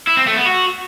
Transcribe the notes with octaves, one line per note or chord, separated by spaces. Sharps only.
E4
C4
A3
B3
F#4